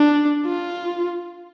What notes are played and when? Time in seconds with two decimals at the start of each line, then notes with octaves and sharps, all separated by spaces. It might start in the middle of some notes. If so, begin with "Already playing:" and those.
Already playing: D4
0.46 F4